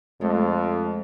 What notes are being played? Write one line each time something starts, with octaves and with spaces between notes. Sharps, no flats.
F2 G#3 A3